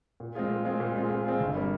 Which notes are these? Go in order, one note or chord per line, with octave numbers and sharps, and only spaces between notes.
A#2
G#3 C4 F4 G#4
A#2
G#3 C4 F4 G#4
A#2
G#3 C4 F4 G#4
A#2
G#3 C4 F4 G#4
G1
G3 A#3